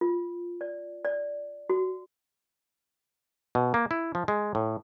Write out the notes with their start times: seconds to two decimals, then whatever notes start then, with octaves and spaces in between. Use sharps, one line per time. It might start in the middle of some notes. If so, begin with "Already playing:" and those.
0.01 F4
0.61 D5
1.05 D5
1.70 F#4
3.55 B2
3.74 A#3
3.91 E4
4.15 F3
4.28 G#3
4.55 A2